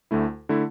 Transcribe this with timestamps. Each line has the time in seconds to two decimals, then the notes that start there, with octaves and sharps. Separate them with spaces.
0.11 D2 D3 A3 E4
0.49 D3 A3 E4